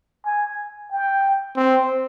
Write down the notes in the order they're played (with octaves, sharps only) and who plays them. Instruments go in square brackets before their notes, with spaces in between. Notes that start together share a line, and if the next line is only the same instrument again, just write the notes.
[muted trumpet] G#5
G5
[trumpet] C4